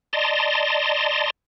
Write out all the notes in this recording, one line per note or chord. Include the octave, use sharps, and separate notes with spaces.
D5 D#5 A5 A#5 C6